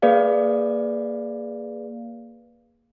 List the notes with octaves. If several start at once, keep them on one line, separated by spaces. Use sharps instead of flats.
A#3 G#4 B4 D5 F5